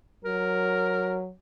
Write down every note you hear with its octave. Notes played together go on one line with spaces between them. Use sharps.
F#3 A#4